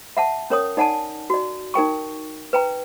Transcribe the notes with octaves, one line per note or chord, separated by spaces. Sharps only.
E5 F#5 A5
C#4 A#4 C#5 D#6
D#4 D5 F#5 G#5 A5
F#4 D5
D#4 A#4 G5 C#6
B4 G5 A#5